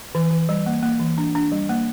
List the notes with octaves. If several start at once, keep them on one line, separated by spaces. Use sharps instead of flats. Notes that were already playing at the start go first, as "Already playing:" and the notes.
E3
E3
G3
A#3
A#3
E3
D4
D4
G3
A#3